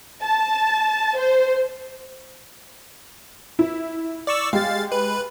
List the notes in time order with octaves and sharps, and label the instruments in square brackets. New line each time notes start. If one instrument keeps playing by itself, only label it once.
[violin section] A5
C5
[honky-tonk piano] E4
[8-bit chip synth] D5 C#6 E6
[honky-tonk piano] G#3 G4 [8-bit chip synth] F5 A6
[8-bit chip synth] B4